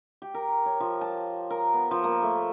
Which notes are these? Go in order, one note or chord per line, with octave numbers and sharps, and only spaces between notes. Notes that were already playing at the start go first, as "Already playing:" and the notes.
G4
A#4
C#5
F3
A5
A#4
B3
F3
A#3
A3